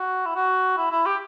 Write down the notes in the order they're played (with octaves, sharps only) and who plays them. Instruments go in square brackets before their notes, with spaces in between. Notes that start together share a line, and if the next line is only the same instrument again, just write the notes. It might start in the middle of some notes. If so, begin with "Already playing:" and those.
Already playing: [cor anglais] F#4
E4
F#4
E4
E4
G4